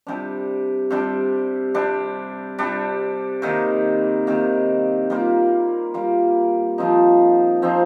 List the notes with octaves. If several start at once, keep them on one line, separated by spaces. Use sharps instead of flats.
C3 G3 D4
C3 G3 D4
C3 G3 D4
C3 G3 D4
C3 D#3 A#3
C3 D#3 A#3
G3 A#3 F4
G3 A#3 F4
F3 C4 D#4
F3 C4 D#4